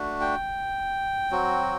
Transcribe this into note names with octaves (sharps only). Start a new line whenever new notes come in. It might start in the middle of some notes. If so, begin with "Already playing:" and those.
Already playing: A3 D4 F#4
G5
F#3 C4 F#4